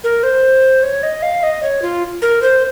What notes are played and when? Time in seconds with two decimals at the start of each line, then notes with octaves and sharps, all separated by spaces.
0.04 A#4
0.23 C5
0.83 C#5
1.03 D#5
1.23 F5
1.43 D#5
1.63 C#5
1.82 F4
2.22 A#4
2.42 C5